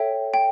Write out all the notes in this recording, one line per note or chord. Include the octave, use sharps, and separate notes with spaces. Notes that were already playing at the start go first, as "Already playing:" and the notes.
Already playing: A4 C#5 E5 G5
G5